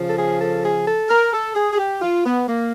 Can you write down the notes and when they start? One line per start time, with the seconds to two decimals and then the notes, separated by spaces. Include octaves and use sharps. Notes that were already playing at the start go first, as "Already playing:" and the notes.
Already playing: C#3 F3
0.09 A4
0.16 G#4
0.39 A4
0.62 G#4
0.86 A4
1.09 A#4
1.32 A4
1.55 G#4
1.72 G#4
1.78 G4
2.00 F4
2.25 B3
2.48 A#3